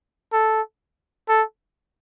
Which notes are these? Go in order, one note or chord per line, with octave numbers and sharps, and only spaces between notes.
A4
A4